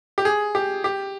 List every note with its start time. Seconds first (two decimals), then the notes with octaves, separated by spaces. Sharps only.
0.18 G4
0.25 G#4
0.55 G4
0.84 G4